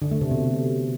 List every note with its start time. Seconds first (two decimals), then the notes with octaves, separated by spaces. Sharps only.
0.02 D3
0.11 A3
0.21 C3
0.31 B2